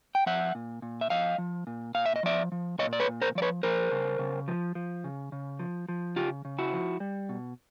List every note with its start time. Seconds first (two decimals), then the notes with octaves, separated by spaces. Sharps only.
0.15 G5
0.26 F3 E5 F#5
0.55 A#2
0.82 A#2
1.01 E5
1.10 F3 D#5 F5
1.38 F3
1.67 A#2
1.95 A#2 F5
2.06 E5
2.16 D#5
2.23 F3 D5 E5
2.52 F3
2.79 A#2 C#5 D#5
2.93 D5
3.00 B4 C#5
3.07 A#2
3.22 A#4 C5
3.35 F3 D5
3.42 B4 C#5
3.63 F3 A#4 C5
3.91 C#3
4.19 C#3
4.48 F3
4.75 F3
5.04 C#3
5.32 C#3
5.60 F3
5.89 F3
6.16 C#3 F4 G4
6.45 C#3
6.58 E4 F#4
6.73 F3
7.00 G3
7.29 B2